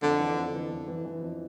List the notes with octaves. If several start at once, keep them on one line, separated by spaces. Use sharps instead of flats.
F2 D3
E3
F2
E3
F2
E3
E3
F2